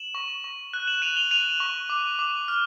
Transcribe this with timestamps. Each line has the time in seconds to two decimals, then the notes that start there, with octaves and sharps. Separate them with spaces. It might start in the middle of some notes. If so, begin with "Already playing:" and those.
Already playing: E7 F#7
0.15 C#6
0.44 C#6
0.73 F#6
0.87 E7 F#7
1.02 F#6 D#7 F7
1.17 F7 G7
1.31 F#6 D#7 F7
1.60 C#6
1.90 D6
2.19 D6
2.48 F6